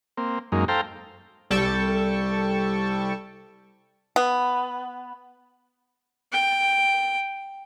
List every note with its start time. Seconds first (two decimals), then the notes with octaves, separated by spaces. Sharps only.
0.17 A#3 C4
0.52 F#2 G#3 A#3 D#4
0.68 A4 C5 F5 G5 A#5
1.50 C2 G3 A4 G5 A5 C#6
4.16 B3
6.33 G5